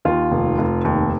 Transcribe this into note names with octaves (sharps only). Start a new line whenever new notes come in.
D#2 F4
F1
F1
D#2